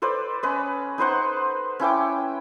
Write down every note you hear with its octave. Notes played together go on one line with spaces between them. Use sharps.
A4 B4 C5 D5
C#4 B4 D#5
D#4 B4 C5 F#5
C#4 E4 G5 D6